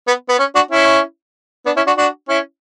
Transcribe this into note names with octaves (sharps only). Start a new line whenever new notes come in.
B3
B3
C#4
D4 F#4
C#4 E4
B3 D4
C#4 E4
D4 F#4
D4 F#4
C#4 E4